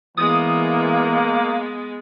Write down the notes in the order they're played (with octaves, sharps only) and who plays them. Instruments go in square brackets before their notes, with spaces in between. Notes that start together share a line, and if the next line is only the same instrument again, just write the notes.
[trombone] E3 [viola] G#3 B3 [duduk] A#3 [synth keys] D#6